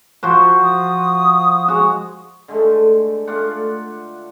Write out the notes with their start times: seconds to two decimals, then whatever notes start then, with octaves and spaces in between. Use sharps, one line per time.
0.23 F3 F#4 C5
0.63 D#6
1.68 G#3 F#4
2.48 D3 G#3 A3
3.27 A3 D4 F4 F#5